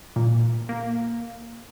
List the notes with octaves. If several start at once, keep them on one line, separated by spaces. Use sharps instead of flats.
A#2
A#3